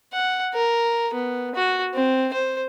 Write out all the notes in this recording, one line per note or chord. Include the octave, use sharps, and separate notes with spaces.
F#5
A#4
B3
F#4
C4
C5